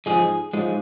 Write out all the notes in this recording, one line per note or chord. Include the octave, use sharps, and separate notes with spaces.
G#2 F3 G#3 G#4
G#2 F3 G#3